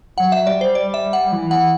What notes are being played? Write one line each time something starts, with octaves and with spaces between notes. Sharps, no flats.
F#3 F#5
E5
G3 D5
C5
D5
E5
F#5
E3
F#5